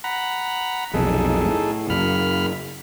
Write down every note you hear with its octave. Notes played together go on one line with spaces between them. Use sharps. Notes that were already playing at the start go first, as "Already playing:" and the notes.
F#5 A#5 B5
B1 F2 C3 D#4 G#4 A4
A2
F#2 C#3 A#3 B5 F6